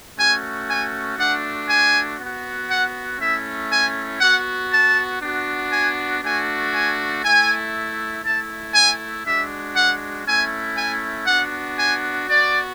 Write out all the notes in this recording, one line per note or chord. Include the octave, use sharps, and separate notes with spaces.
A3 C#4 F#4 G#5
G#5
A3 D4 F#4 F#5
G#5
B3
F#4
F#5
A3 C#4 E4 E5
G#5
B3 F#4 F#5
A5
B3 D4 F#4
G#5
A3 D4 F#4 G#5
G#5
A3 E4 G#5
A3 E4 A5
G#5
G#3 D4 F#4 E5
F#5
A3 C#4 E4 G#5
G#5
B3 D4 F#4 F#5
G#5
B3 F#4 D5